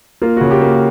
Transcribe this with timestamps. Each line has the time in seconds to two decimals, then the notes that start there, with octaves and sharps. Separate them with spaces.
0.22 A#3 F4
0.37 C#3 F#4
0.51 G4
0.61 A#3